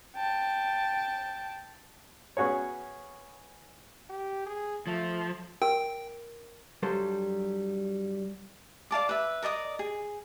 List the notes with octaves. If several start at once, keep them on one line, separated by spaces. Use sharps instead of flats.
G5 A5
B3 C#4 F#4 G#4 C#5
G4
G#4
F3 A3
A#4 G5
G2 F#3 G3 A4 C5
D5 F5 A5 D6
B4 E5
A#4 D5 D#5 D#6
G#4